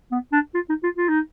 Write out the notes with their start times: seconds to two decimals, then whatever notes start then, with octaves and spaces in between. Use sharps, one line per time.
0.11 B3
0.32 D4
0.54 F4
0.69 D#4
0.83 F4
0.97 F4
1.09 D#4